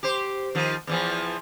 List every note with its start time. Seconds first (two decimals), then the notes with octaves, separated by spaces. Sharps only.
0.03 G4 C5
0.55 D#3 F3
0.87 E2 E3 F3